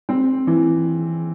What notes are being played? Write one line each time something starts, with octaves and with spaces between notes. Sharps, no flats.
C4
E3